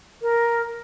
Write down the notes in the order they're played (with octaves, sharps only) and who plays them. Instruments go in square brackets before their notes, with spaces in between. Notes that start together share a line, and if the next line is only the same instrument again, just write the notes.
[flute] A#4